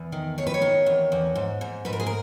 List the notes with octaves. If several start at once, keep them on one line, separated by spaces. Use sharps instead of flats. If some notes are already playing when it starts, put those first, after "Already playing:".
Already playing: E2
D#3
D#3 C#5
B4
C#5
D#3
E2
E2
G#2
G#2
G#2 B4
A#4
G#4
A#4